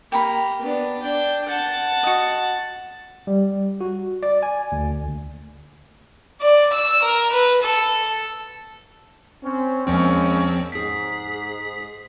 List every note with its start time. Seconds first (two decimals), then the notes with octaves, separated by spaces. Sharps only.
0.12 A#3 G4 A#5 B5
0.61 B3 D4
1.02 D4 G5
1.48 F#5 A5
2.03 F#4 D#5
3.27 G3
3.81 F#4
4.23 D5
4.43 G#5
4.72 D2
6.41 D5
6.73 E6
7.03 A#4
7.32 B4
7.62 A4
9.43 C4 C#4
9.87 E2 F3 G#3 A#3 C4 C#4
10.72 G#2 G#4 B6